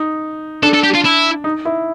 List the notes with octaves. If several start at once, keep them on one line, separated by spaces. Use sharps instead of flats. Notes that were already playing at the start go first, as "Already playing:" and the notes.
Already playing: D#4
D4 A4
A4
G4
F4
E4
D#4
E4